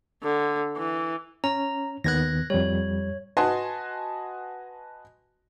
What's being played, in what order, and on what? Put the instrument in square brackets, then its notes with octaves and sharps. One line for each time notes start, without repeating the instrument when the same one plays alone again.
[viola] D3
E3
[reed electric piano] C#4 [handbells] A#5
[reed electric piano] D#2 D#3 B3 [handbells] F#6 G#6 A#6
[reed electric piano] F2 G3 [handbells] C#5
[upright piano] F#4 B4 D#5 G#5 A5 C6